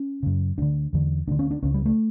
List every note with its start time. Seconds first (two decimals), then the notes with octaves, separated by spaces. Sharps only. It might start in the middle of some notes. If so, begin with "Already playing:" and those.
Already playing: C#4
0.23 F#2 C#3
0.58 D2 D3 D4
0.93 E2 D3
1.27 D2 D3 D4
1.39 C#4
1.51 D4
1.63 C#2 C#3 C#4
1.74 G3
1.86 A3